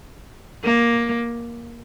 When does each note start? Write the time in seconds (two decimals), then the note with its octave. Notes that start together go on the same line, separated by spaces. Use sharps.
0.64 A#3